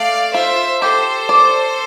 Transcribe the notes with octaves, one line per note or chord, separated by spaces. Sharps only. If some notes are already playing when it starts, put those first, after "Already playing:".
Already playing: A3 D5 F5
F4 C5 E5
G4 A4 C5
D5